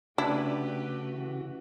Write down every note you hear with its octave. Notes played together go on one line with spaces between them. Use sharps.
C#3 A3 D4 E4 F#4 G4 B4
E3